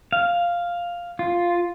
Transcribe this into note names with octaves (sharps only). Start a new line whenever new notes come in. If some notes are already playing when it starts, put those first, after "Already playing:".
F5
F4